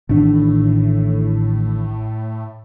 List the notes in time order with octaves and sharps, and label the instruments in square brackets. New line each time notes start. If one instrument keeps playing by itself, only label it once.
[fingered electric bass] A1 D#3 D4 [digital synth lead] A2